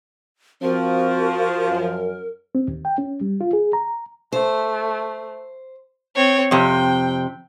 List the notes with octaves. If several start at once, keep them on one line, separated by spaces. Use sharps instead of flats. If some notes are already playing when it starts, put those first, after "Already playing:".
F3 C4 F#4 A#4
F#2
C4
D#2
G5
C#4
G3
F4
G#4
A#5
A3 C5
C4 C#5
F2 C3 G5